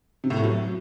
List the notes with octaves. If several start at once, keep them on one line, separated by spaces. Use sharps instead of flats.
C3
A2
A3
F#3